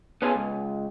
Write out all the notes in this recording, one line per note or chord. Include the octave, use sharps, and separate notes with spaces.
B3 C#4 F4 G#4 A4
C#2